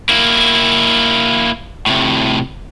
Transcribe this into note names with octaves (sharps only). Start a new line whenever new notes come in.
A#3 E4
A2 C3